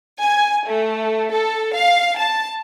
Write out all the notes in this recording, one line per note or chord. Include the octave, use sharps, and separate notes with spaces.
G#5
A3
A4
F5
A5